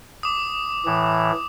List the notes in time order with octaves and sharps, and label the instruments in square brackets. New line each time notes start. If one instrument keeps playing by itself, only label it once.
[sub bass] E1 [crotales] D6 D#6
[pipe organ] A2 E3